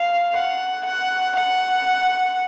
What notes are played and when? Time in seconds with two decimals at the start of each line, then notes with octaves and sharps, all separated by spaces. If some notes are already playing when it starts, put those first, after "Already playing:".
Already playing: F5
0.35 F#5
0.85 F#5
1.35 F#5